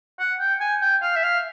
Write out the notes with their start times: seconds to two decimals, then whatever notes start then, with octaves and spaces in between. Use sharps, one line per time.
0.19 F#5
0.40 G5
0.60 G#5
0.81 G5
1.02 F5
1.16 E5
1.23 F5